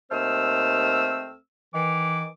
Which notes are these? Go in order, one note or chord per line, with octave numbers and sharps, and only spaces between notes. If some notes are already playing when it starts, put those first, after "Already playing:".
D#2 A3 C4 C5 E6 F6
D#3 E3 D6